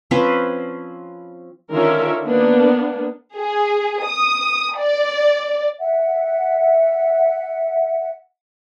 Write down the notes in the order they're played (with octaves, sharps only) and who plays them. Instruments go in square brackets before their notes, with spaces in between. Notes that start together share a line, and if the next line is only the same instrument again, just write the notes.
[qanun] F3 C4 C#4 B4
[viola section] D3 D#3 C#4 F4 A#4 E5
A#3 B3 D4
[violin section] G#4
D#6
D5
[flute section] E5 F#5